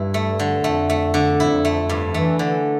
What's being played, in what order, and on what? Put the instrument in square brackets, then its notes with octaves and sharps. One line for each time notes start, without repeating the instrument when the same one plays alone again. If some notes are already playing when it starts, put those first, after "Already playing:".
Already playing: [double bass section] G2 [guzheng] E4
[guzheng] A3
D3
[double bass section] F2 [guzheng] A3
[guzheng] A3
D3
[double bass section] F2 [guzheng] E4
[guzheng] A3
G2
[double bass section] E3 [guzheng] A3
[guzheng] D3